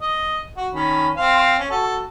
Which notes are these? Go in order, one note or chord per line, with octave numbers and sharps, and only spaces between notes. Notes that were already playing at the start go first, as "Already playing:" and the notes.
D#5
F#4
D#3 C#4 B5
C4 C5 F5
C#4
F#4 A4